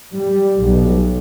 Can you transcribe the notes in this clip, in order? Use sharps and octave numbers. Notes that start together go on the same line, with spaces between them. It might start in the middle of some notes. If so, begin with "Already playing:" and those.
G3
B1